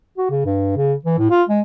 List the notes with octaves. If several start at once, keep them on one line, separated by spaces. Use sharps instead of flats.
F#4
C#3
G2
C#3
E3
A2
F4
G#3